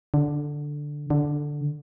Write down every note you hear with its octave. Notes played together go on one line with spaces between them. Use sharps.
D3
D3